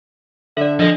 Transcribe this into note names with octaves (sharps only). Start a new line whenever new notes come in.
D3 A4 D5 E5
F3 D4 A4 D#5